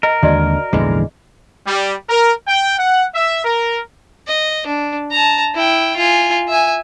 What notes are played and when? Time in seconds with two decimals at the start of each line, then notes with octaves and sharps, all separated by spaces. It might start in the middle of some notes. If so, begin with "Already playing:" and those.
0.03 A#4 D#5
0.23 D#2 D3 G#3 F#4 D5 D#5
0.73 A#1 E2 G#2 D3 E3 G#3 D#5
1.67 G3
2.10 A#4
2.48 G5
2.79 F#5
3.15 E5
3.45 A#4
4.27 D#5
4.66 D4
5.11 A5 A#5
5.55 E4 G5
5.96 F4 G#5
6.48 E5 G#5